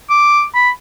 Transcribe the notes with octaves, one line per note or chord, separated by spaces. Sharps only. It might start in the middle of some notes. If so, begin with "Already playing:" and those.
D6
B5